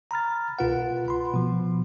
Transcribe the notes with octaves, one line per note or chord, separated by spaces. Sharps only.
A#5 B5 F6 A6
C2 B2 F4 B4 F#5
B5 C6
B2 F3